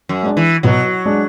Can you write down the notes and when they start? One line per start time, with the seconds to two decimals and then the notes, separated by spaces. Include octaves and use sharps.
0.09 F#2
0.23 G#3 D4
0.37 E3
0.63 B2 F#3
1.05 G#3 D4